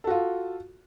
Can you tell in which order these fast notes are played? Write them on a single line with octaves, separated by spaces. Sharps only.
A4 F#4 F4